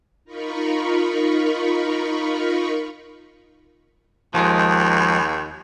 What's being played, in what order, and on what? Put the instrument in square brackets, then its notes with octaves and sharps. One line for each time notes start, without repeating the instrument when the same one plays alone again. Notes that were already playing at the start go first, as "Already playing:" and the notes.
[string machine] D#4 F4 A#4 B5 C#6
[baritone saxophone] D#2 [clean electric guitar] F3 G#3